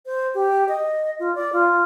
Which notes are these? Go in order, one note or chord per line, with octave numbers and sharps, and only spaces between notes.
C5
G4
D#5
F4
D5
F4